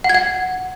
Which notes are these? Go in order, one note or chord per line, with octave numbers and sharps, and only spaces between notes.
F#5
G#6
F#5